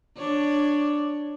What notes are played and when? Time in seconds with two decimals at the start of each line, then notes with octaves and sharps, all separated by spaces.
0.17 D4 C#5 D5